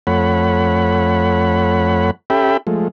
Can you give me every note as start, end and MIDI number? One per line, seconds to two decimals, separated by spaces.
0.07 2.11 41
0.07 2.11 57
0.07 2.11 73
0.07 2.11 78
0.07 2.11 83
2.30 2.57 61
2.30 2.57 67
2.30 2.57 69
2.30 2.57 76
2.30 2.57 79
2.30 2.57 83
2.67 2.88 53
2.67 2.88 56
2.67 2.88 57